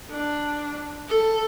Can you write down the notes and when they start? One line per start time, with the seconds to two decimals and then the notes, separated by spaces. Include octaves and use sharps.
0.11 D4
1.08 A4